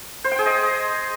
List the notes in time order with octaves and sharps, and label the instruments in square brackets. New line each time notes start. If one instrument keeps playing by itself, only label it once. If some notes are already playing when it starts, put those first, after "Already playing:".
[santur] C5
G5
G#4
D#5